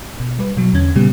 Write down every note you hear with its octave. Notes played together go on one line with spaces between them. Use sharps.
B2
G3 B4
B2 F#3
E2 D3 C#4 G#6
A#2 C#3 G3 B3 G4